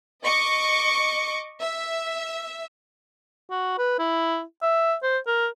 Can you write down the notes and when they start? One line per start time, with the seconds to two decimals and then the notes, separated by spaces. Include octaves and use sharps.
0.22 D#5 C#6 D6
1.61 E5
3.51 F#4
3.78 B4
3.99 E4
4.62 E5
5.03 C5
5.27 A#4